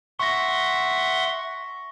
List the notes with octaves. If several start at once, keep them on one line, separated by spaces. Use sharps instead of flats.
E5 F#5 C6 C#6 A#6